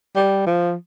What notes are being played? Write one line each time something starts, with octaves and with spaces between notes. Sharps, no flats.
G3
F3